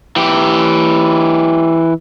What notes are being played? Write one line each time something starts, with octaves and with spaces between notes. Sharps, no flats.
E3 G4